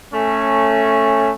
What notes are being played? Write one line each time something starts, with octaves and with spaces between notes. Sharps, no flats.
A3 C#4